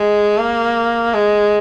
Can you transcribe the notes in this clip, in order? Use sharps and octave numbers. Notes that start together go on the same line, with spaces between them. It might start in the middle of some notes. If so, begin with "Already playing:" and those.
Already playing: G#3
A#3
G#3